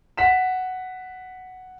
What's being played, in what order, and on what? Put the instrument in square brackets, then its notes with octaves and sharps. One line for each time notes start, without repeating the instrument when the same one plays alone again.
[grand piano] F#5 B6 E7